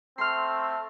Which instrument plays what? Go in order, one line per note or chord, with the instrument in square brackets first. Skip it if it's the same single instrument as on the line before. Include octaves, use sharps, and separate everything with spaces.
[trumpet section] A3 C4 [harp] C6 F6